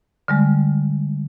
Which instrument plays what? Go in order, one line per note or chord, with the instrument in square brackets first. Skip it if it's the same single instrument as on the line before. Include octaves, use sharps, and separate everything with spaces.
[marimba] D3 G3 G#3